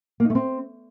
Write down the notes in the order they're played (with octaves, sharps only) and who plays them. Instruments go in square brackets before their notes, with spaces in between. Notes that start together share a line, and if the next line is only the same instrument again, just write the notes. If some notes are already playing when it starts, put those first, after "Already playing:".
[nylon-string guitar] A#3
D#4
A3
C4